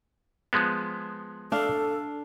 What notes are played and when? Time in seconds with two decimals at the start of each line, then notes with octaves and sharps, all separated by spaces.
0.53 F3 G#3 B3
1.52 D4 A4 F5